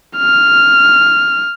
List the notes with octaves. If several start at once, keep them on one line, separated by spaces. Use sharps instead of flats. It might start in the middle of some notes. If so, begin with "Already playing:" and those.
F6